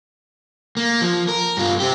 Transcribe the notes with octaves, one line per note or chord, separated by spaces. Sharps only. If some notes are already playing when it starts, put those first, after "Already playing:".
A#3
F3
A#4
G2 F4
C4 G4